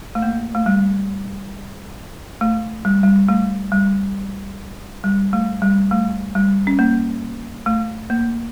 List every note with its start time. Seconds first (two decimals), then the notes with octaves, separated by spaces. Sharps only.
0.15 A3
0.22 A#3
0.55 A3
0.66 G3
2.41 A3
2.85 G3
3.03 G3
3.29 A3
3.72 G3
5.04 G3
5.33 A3
5.62 G3
5.91 A3
6.35 G3
6.67 C#4
6.79 A#3
7.66 A3
8.10 A#3